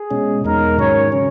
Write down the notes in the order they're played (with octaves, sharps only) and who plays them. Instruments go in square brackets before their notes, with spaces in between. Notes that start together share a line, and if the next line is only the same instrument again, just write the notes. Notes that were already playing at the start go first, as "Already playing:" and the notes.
Already playing: [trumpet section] G#4
[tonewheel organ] B2 G#3 C#4
[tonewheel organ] E2 B2 G#3 D#4 [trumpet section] A#4
[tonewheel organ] G#2 D#3 F#3 C#4 [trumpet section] C#5
[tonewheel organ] C#3 F#3 C#4